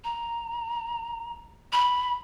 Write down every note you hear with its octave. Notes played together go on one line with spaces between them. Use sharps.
A#5
B5